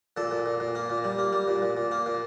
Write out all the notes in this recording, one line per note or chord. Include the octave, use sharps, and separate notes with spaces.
A#2 A4
A#2
A#2
A#2
A#3
A#2
G3
A#3
G3
A#2
A#2
A#2
A#3
A#2